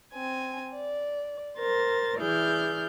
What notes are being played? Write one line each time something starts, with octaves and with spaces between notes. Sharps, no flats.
C4 G#5
D5
A#4 C5 A6
E3 E4 G#4 D5 F6 G6